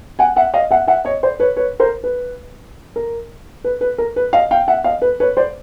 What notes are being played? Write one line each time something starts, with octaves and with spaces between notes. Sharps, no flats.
F#5 G#5
E5 F#5
D#5 F5
E5 F#5
E5 F#5
C#5 D#5
C5 D5
B4 C#5
B4 C#5
A#4 C5
B4
A#4
B4
B4
A#4
B4
D#5 F5
F5 G5
E5 F#5
D#5 F5
B4
B4 C#5
C5 D5